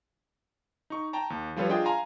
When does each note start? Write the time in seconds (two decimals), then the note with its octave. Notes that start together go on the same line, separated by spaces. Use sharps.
0.90 D#4 C#6
1.13 G5 A5 A#5
1.30 D#2
1.56 F3 G3 F4 A4 B4 C#5
1.69 D4 F4 G#4 D#5 G5
1.86 F5 G#5 A#5 C6